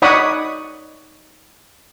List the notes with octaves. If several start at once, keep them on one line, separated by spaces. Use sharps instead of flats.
D#4 C#5 D5 F#5 B5 D#6